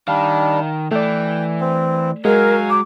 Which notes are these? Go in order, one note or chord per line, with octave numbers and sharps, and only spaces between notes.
D#3 G3 D4 F5
E3 A3 D5 G5
C4
F#3 G#3 A#4 F5 G#5
D6